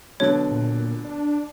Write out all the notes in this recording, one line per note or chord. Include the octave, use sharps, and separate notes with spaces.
B2 D3 F#3 C#5
A#2
D4